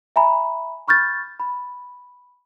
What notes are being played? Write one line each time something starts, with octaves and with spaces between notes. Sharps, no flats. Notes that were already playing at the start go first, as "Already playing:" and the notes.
E5 G#5 A#5 B5
B5 C#6 F6 G6 A6
B5